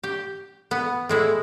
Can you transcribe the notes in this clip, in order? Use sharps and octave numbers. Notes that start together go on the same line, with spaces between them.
G4
B3
A2 G#3 E4